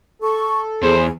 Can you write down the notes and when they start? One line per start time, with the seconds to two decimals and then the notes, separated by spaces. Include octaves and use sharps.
0.22 A4 C#6
0.83 E2 G#4 C5